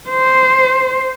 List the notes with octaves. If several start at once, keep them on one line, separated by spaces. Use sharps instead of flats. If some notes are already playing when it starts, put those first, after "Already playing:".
C5